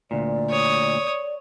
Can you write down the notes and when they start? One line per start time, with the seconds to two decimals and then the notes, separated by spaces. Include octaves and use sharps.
0.11 D2 A#2 D5
0.50 C#5 D#6